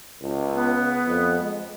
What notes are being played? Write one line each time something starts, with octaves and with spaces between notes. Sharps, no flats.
C#2
B3
F2
G#3